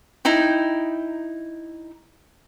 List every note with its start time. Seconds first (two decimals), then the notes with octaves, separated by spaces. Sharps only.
0.25 D#4 E4 G5